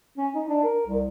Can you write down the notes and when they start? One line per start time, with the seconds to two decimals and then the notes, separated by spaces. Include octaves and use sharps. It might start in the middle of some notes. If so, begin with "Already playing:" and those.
0.17 C#4
0.34 D#4
0.49 D4
0.63 A#4
0.86 C2